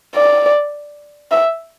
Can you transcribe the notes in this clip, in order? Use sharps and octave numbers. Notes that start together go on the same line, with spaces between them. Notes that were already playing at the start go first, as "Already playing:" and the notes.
D5
E5